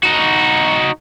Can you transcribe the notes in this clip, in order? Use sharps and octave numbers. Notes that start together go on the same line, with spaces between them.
D#4 F#4